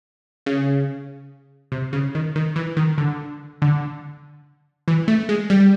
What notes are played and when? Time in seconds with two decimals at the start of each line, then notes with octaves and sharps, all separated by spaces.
0.46 C#3
1.72 C3
1.93 C#3
2.15 D#3
2.36 D#3
2.56 E3
2.77 D#3
2.98 D3
3.62 D3
4.88 E3
5.08 A3
5.29 G#3
5.50 G3